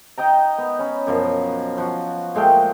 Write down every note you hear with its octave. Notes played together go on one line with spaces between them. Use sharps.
D#4 D#5 G5 A#5
B3
C#4 B5
F#2 B2 F3
F3 F#4
A#2 G#3 A3 G5